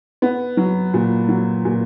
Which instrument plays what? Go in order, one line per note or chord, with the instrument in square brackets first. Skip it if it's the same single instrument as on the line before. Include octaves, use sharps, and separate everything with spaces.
[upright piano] B3
F#3
A#2
F#3
A#2